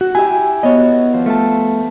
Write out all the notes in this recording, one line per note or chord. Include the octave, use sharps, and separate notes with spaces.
F#4
E4 G4 E5 G#5
B3 F#4 C#5 D#5
F3
A3 F4 A5